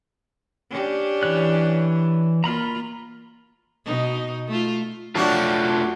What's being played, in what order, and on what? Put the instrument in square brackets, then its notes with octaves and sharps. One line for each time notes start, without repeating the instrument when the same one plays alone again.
[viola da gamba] C#4 D4 G4
[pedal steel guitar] E3 C#5 F#6
[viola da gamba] A#3 F4 [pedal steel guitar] A#5 B5 F6
[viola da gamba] B2 D#4
A3 F4
[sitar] F#3 D4 F#4 [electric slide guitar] A3 F4 A5